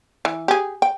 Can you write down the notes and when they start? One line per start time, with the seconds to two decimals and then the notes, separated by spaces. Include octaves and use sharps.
0.25 E3
0.48 G4 G#4
0.82 G5